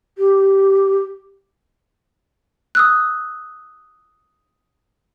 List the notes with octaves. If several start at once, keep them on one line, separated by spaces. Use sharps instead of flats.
G4
D#6 E6 F#6